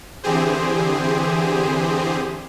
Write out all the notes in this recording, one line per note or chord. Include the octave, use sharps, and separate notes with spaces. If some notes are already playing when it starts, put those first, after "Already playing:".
D3 E3 C4 G4 G#4 C5